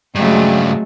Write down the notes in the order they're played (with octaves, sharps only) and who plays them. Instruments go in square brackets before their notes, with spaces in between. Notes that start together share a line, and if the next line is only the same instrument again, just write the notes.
[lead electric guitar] G2 C#3 [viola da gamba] F#3 G#3 A3